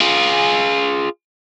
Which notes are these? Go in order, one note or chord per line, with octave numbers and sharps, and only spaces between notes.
F4 G#4